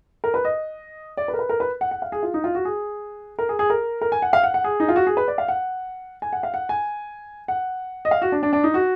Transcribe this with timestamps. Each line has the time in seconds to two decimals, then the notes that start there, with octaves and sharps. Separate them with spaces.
0.24 A#4
0.34 B4
0.45 D#5
1.17 D5
1.28 B4
1.34 A#4
1.39 B4
1.49 A#4
1.60 B4
1.81 F#5
1.91 F#5
2.02 F5
2.12 G#4
2.23 F4
2.34 D#4
2.44 F4
2.55 F#4
2.65 G#4
3.39 A#4
3.49 G#4
3.59 G#4
3.70 A#4
4.01 A#4
4.12 G#5
4.22 F#5
4.33 F5
4.43 F#5
4.54 F#5
4.64 G#4
4.80 D#4
4.89 F4
4.96 F#4
5.07 G#4
5.17 B4
5.28 D5
5.38 F5
5.48 F#5
6.22 G#5
6.33 F#5
6.43 F5
6.54 F#5
6.69 G#5
7.48 F#5
8.05 D#5
8.11 F5
8.22 F#4
8.32 D4
8.43 D4
8.53 D4
8.64 D#4
8.74 F#4